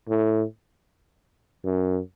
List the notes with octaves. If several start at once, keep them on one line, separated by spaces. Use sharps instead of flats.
A2
F#2